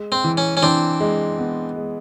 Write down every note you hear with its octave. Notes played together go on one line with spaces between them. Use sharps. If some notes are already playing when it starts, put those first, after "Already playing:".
Already playing: G#3
C4
E3
C#4
C#4
E3 C4 D4
G#3
B3
G#3